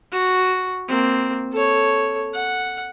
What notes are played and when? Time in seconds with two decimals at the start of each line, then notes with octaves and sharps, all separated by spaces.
0.12 F#4
0.89 A#3 C4
1.53 A4 C#5
2.34 F#5